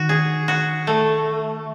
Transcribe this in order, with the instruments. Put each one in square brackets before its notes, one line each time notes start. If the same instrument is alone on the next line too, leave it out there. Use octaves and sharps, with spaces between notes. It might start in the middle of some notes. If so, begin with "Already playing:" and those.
Already playing: [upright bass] D#3 [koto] F#4
[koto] G#4
F#4
A3